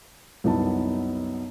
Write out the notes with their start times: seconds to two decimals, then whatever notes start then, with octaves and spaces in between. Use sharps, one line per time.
0.44 C2 F#2 B3 D#4 A5